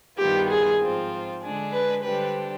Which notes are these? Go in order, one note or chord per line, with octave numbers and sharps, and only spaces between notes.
G2 D#3 G3 B3 F4 G4
G#4
G#2 F3 C4 F4
D3 G#3 D4 G#4 D5
B4
D3 G3 D4 G4 B4 C5